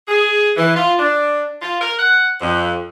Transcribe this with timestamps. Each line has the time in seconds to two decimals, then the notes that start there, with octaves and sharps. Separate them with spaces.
0.08 G#4
0.56 E3
0.75 F4
0.99 D4
1.61 F4
1.80 A#4
1.97 F#5
2.41 F2